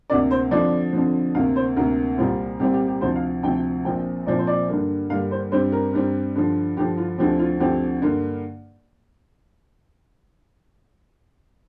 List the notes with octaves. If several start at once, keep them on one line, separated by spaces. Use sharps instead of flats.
D2 C3 A#3 D5
C5
F2 D3 F3 D5
F2 D3 F3
D2 C3 A#3 F5
C5
D2 C3 A#3 A#4
C2 A#2 G3 C4 F4
C2 A#2 G3 C4 G4
G4
G4
D2 C3 F3 C5
F5
D2 C3 F3 G5
A#1 A#2 F3 C4 G5
A#1 A#2 F3 C4 D5
C5
D5
G2 D3 G3 A#3
G2 D3 G3 A#3 F5
C5
G2 G3 C4 C5
A#4
G2 G3 C4
G2 D3 F3
G2 D3 F3 G4
F4
D2 D3 F3 C4 G4
F4
D2 D3 F3 C4 G4
G2 D3 A#3